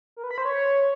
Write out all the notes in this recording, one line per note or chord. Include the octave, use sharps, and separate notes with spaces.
A#4
B4
B5
C5
C#5